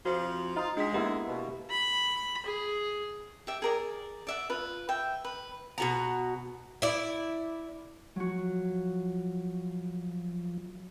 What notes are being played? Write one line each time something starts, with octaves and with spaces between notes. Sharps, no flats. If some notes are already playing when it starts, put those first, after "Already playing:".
F2 C3 F3 F#4 C5
D#4 F4
G#3 D4 B6
A#3 B3 E4 G4
B2
B5
G#4
G4 E5
G#4 A#4 D5
D5 E5 F#5
F4 B4
E5 G5
B4
B2 F#4 A#5
E4 D5
F3 F#3 F#4